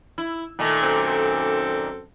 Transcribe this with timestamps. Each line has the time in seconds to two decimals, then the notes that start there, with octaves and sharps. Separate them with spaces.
0.18 E4
0.59 A#2 D#3 A3
0.81 F#2 C4 A4